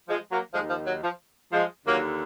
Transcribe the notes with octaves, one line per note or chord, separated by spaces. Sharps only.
F3 G#3
F#3 A#3
D#2 D#3 F3 G#3
F3
F#3
F3
F3 G#3
D#2 D3 F#3 A#3